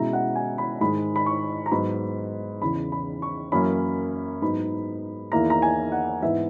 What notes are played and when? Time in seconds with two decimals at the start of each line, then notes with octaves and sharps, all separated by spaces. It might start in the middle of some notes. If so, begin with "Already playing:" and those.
Already playing: B2 G#3 C#4 E4 A#5
0.13 F#5
0.36 G#5
0.58 B5
0.81 G#2 D#3 G#3 B5
1.16 B5
1.26 C#6
1.66 A#5
1.71 G#2 F#3 B3 B5
2.61 E2 C#3 E3 B5
2.92 B5
3.22 C#6
3.52 F#2 E3 A#3 C#4 E4 B5
4.42 G#2 F#3 B3 D#4 B5
5.32 E2 D#3 A#3 E4 A#5
5.50 A#5
5.62 G#5
5.92 F#5
6.22 G#2 E3 B3 E4 E5